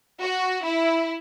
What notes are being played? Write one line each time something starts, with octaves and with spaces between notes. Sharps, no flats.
F#4
E4